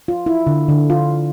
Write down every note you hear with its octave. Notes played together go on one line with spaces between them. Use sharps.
F4
E4
D3
D3
F4